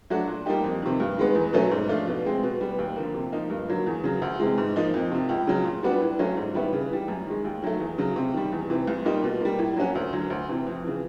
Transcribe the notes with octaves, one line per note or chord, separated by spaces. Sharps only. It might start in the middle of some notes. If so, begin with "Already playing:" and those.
F#3 A3 D4 F#4
A#2
G3 A#3 D#4 G4
F2
C3 D#3
G2
D#3 G#3 B3
E2
B2 F#3 A3 C#4
G#2
F3 A3 D4 F4
B2
G#3 C4
B2
G3 B3
D#2
D3 F3 A#3
C3
F3 A#3 D#4
G2
D3 F#3 A#3
E2
C#3 F#3
D2
C3 E3 G#3
G#2
F3 A#3 D#4
F2
C3 F3
C#2
C#3 F#3
A#2
G3 B3 D4 F#4
A2
F#3 A3 C#4 F4
G#2
D#3 G3 B3 E4
C#3
E3 G3
F#2
D#3 G#3
D#2
D#3 F#3 A3
E2
C#3 F#3
C3
D#3 G3
E2
C3 E3
C2
A#2 G3 A#3 D#4
B2
G3 A#3
A2
F#3 A#3 C#4 F#4
D2
D3 F#3
D2
C3 E3
F2
C#3 E3